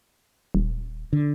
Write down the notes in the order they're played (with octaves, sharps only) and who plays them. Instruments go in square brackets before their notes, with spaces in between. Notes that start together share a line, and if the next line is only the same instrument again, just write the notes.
[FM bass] D#1
[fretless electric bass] D3